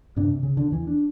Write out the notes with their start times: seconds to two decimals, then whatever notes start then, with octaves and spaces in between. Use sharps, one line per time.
0.16 G2 C3 D4
0.30 C3
0.43 C#3
0.57 D3
0.71 E2 E3
0.87 D4